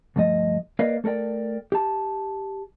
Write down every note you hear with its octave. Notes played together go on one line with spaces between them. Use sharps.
D2 G2 F3 A3 D#5
A#3 A#4 B4 D5 D#5 F5
A3 A4 A#4 D5 G5
G4 A5